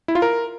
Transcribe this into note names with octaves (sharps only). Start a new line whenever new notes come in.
E4
F4
A#4